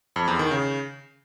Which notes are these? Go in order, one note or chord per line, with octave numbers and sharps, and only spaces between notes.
F2
E2
D#3
C#3